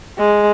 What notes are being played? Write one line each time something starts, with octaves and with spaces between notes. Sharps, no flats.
G#3